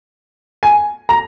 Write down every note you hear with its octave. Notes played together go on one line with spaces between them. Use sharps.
G#5
A#5